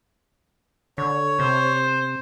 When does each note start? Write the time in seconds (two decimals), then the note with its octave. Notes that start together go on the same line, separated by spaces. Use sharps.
0.98 D3 C#5
1.39 C3 C5